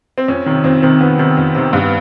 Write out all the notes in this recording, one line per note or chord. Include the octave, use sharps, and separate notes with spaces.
C4
F2 C#4
C3 D#3
F2 C4
C3 D#3 C4
F2 B3
C3 D#3
F2
C3 D#3
G2 B3